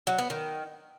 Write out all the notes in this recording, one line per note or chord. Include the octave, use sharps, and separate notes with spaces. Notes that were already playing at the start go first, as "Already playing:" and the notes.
F#3
B3
D#3